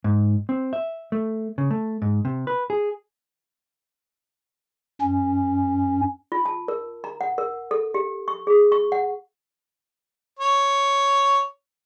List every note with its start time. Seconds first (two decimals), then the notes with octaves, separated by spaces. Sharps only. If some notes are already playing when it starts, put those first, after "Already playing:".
0.04 G#2
0.49 C4
0.73 E5
1.12 A3
1.58 C#3
1.71 A3
2.02 G#2
2.25 C3
2.47 B4
2.70 G#4
5.01 F#2 C#4
6.32 F4
6.46 A5
6.68 A#4
7.04 A#5
7.21 F#5
7.38 A#4
7.71 A4
7.94 G4
8.28 C#6
8.47 G#4
8.72 C#6
8.92 F#5
10.39 C#5